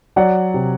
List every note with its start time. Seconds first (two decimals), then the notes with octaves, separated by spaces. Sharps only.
0.16 F#3 D5 F#5
0.54 C3